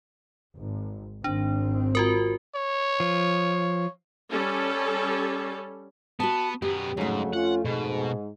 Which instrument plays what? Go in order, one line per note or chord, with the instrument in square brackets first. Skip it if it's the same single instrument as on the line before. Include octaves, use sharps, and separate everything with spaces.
[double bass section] G#1
[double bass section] G#1 C4 [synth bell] D4
[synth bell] F4 F#4 A#4
[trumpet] C#5
[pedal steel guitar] F3
[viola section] G3 C#4 A4
[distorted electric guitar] B3 [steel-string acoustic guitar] F#4 A5
[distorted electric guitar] F#2 B3 [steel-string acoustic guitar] G4
[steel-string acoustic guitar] F2 A3 [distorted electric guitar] G#2 [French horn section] C#3 F#3
[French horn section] C#4 F4 [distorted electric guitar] F#5
[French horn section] G#2 [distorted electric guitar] B2